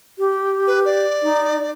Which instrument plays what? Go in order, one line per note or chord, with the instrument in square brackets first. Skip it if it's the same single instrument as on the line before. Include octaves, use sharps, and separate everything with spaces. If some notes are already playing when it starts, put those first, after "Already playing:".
[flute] G4
[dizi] B4
D5
[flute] D#4